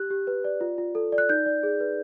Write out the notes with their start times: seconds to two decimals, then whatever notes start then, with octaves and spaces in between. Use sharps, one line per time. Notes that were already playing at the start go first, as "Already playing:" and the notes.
Already playing: G4 F#6
0.10 G4
0.27 B4
0.44 D5
0.61 F4
0.78 F4
0.95 A4
1.12 D5
1.18 F#6
1.29 D#4 G6
1.46 D5
1.63 G#4
1.80 B4